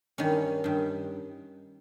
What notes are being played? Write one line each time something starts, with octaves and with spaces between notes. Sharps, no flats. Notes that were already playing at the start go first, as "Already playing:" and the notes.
G2 D#3 C#4
G2 D#3